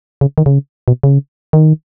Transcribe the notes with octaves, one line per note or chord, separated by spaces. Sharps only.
C#3
D#3
C#3
B2
C#3
D#3